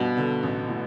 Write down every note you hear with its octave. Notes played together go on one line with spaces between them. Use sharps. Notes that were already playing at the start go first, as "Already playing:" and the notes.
Already playing: G1 G2 B2 B3
D3
A1
A2